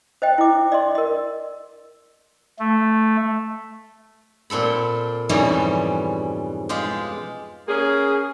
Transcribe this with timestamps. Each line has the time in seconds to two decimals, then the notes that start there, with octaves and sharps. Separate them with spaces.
0.22 C5 D#5 G5
0.38 E4 D6
0.72 D5 D#5 C6
0.95 A#4 D#5
2.59 A3
4.50 A#2 C4 A4 B5
5.29 F2 G#2 B2 E3 G3 C#4
6.69 G#3 F4 G4
7.68 A#3 C#4 G#4